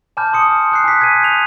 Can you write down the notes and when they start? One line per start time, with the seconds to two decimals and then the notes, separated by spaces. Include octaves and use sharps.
0.17 G#5 A5 B5 D6 F6 G6
0.33 C6 D#6 C#7
0.72 D#6 F#6 C7
0.84 G#5 D6 B6
1.01 G#6 B6 C7 D#7
1.20 G6 C7 F7